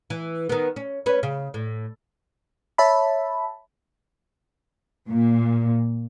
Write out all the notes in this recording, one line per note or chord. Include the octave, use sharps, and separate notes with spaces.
E3
D#3 B3
C#4
C#4 B4
C#3
A2
C#5 E5 A5 B5
A#2